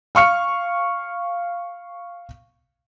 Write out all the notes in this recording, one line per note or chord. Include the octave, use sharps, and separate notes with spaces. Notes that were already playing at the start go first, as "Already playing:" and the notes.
F5 C#6 F6 C#7